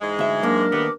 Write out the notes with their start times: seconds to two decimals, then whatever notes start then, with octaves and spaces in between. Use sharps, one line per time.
0.02 G#2 E3 G#3
0.19 D2 E5
0.43 F#2 A#3 D4 A#4 D6
0.72 D#2 G3 A3 B3